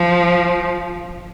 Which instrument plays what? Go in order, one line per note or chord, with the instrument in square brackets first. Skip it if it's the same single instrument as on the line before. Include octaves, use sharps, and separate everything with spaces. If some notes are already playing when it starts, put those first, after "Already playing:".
Already playing: [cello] F3